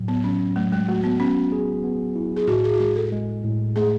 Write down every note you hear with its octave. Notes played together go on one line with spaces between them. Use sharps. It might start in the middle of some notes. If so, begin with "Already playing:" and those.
Already playing: A2 F#3
B3
F#3 C#4
F#3 A3
G#3
A3 F#4
B3
B3 C#4
G#4
B3
E4
G#4
A2 F#4
G#4
F#4
G#3 G#4
A4
G#3
A2
A3 G#4